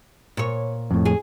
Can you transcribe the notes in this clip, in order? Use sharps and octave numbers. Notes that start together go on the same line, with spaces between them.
A#2 C#5
F2 A2
G#4